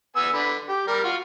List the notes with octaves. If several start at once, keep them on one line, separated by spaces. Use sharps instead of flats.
B3 G#5 E6
D3 B4
G4
G3 A#4
F4 F#4